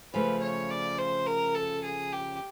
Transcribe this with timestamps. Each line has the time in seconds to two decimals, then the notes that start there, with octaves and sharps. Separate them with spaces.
0.13 C#3 F3 A3 B4
0.42 C#5
0.70 D5
0.98 C5
1.26 A#4
1.55 A4
1.83 G#4
2.12 G4